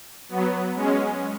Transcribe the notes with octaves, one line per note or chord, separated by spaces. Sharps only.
F#3 B3
G#3 C#4